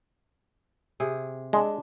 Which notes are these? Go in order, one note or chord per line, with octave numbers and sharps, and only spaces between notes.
C3 G#4
G#3 D4